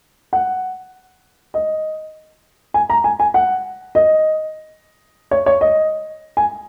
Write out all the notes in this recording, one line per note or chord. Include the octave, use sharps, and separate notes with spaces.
F#5
D#5
G#5
A#5
G#5
G#5
F#5
D#5
C#5
C#5
D#5
G#5